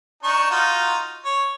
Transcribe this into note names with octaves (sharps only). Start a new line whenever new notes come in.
D4 D#4 C#6
D#4 F4 F#4
C#5